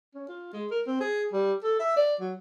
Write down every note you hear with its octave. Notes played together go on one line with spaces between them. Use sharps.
C#4
F4
G#3
A#4
C4
G#4
G3
A4
E5
D5
F#3